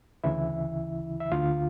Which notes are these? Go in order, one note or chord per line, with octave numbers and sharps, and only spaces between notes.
D2 C#3 E3 E4 E5
E5
D2 D3 F4 F5